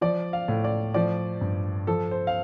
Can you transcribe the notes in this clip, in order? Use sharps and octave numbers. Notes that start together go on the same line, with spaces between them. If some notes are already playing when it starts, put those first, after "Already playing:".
F3 D5
F5
A2
D5
F3 D5
G2
F3 A4
C5
F5